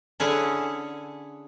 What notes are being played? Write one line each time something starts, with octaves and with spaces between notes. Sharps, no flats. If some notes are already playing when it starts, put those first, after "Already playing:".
D3 C#4 E4 G#4 F#5